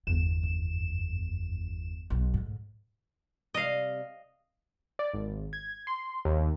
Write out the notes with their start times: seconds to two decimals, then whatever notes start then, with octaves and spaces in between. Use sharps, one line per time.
0.07 G1 E2 B3 E7
0.43 F#2
2.10 B1 B3
2.34 D2 G#2
3.54 C3 G3 D#5 F5
4.99 D5
5.14 G#1
5.53 G#6
5.87 C6
6.25 D#2